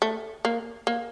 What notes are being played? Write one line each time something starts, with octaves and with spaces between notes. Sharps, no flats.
A3
A#3
A#3